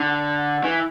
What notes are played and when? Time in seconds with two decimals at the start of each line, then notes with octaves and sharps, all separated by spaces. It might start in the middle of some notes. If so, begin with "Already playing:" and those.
Already playing: D3
0.64 E3